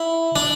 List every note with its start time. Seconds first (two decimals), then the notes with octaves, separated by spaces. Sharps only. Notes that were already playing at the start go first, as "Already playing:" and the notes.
Already playing: E4
0.36 D4